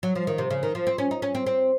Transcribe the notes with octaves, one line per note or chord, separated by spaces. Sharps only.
F#3
F3
D#3
C3
C#3
D#3
F3
C4
C#4
D#4
C#4
C4
C4